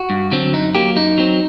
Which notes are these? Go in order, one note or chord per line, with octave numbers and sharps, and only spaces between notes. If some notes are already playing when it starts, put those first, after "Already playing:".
Already playing: F#4
G2
D3 F#3 C4
F#2 D#4
F#3 A#3 G4
F#2 D#4
F#3 C4